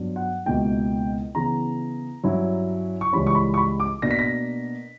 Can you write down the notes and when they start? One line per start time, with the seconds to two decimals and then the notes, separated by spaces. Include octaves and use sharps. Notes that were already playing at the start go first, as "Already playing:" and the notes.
Already playing: G2 F#3 B3 D4
0.16 F#5
0.46 C#2 B2 A#3 E4 G5
1.35 C#3 E3 B3 A#5
2.23 G2 F#3 C#4 E4
3.01 C#6
3.12 C#2 C#3 E3 G3 C#4 B5
3.27 C#6
3.35 B5
3.54 C#6
3.58 B5
3.80 D6
4.02 B2 A#3 D4 A#6
4.11 B6
4.19 A#6